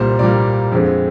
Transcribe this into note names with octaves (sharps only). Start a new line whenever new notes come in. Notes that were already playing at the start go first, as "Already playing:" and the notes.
Already playing: C2 A#2 G3 A#3 C5
C2 A#2 G3 A#3 D5
F2 D3 G#3 C4